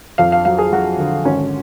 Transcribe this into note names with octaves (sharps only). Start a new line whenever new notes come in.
F2 F5
F5
F#3 F5
G#4
F#3 F#4
D3
G#1 C#4